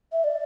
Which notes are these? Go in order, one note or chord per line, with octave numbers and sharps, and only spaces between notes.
E5
D5